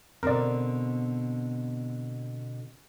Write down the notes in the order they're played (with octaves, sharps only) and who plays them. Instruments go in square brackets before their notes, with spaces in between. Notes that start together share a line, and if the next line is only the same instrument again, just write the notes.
[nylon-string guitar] B2 D3 C4 [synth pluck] A#4 D5